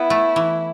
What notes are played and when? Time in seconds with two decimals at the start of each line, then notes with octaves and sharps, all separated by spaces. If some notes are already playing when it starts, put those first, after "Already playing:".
Already playing: B3 E4
0.10 A3
0.36 E3